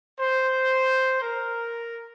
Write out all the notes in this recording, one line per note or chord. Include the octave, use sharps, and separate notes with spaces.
C5
A#4